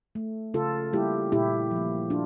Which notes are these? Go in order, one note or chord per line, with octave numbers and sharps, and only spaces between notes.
A3
C#3 F4 A4
G3 A#3 E4 G4
A#2 E4 G4
F3 A#3
D4 F4